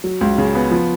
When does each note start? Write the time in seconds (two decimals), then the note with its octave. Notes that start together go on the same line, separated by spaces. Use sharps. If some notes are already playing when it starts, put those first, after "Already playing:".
0.04 F#3
0.21 C#2
0.38 C#3
0.55 B3
0.71 F3